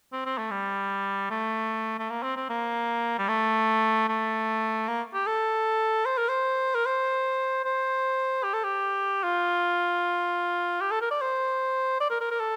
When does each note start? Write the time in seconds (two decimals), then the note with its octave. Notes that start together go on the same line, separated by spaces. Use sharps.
0.13 C4
0.26 C4
0.38 A3
0.51 G3
1.30 A3
1.99 A3
2.10 A#3
2.23 C4
2.36 C4
2.49 A#3
3.18 G3
3.28 A3
4.08 A3
4.88 A#3
5.14 G4
5.27 A4
6.06 C5
6.18 A#4
6.29 C5
6.75 A#4
6.86 C5
7.65 C5
8.43 G4
8.53 A4
8.64 G4
9.23 F4
10.81 G4
10.91 A4
11.01 A#4
11.11 D5
11.21 C5
12.01 D5
12.10 A#4
12.21 A#4
12.31 A#4
12.40 A4